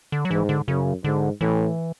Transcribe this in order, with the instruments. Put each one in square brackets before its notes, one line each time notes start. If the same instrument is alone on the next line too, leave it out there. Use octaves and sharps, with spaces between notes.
[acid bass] D3
F#3
[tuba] G#2 [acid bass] E3
[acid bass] D3
[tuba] F#2 [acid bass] C#3
[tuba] G#2 [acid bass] D3
[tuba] A2 [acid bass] E3